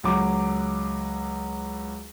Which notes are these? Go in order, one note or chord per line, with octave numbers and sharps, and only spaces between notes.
C#2 F#3 D6